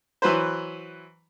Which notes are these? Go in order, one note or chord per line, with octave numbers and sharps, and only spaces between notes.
E3 F#3 B4 C5